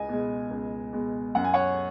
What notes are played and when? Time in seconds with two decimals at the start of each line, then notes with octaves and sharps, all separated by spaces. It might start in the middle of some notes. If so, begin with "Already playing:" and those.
Already playing: C#2 D#5 G#5
0.09 B2 G#3
0.50 C#2
0.93 B2 G#3
1.35 F#2 F#5
1.44 G#5
1.54 C#5 F#5